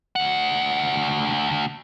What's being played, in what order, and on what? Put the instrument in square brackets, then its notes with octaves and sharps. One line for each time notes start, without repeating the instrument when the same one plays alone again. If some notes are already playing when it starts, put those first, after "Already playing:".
[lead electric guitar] D2 F#5